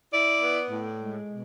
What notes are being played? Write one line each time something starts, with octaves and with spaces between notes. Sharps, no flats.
E4 D5
B3
A2
G#3
B2